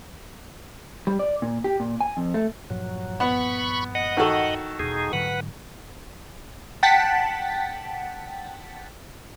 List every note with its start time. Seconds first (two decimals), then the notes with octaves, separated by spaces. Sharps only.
1.07 G3
1.19 D5
1.42 A#2
1.64 G4
1.80 A#2
2.01 G#5
2.17 F2
2.34 A3
2.70 G2 A#2 F3 F#3
3.20 B3 B5 C#6
3.95 D#5 F#5
4.17 D#3 F#4 A4
4.79 E2 B2 D#4 G#4
5.13 G#2 D3 F#3 B4 F#5
6.83 F#5 G5 A5 A6 B6